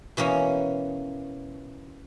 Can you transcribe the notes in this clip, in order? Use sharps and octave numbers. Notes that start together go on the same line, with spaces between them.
B2 E3 A#3 C#4